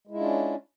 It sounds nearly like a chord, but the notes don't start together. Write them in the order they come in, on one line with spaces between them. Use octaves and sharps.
G#3 E4 F4 D4 C#4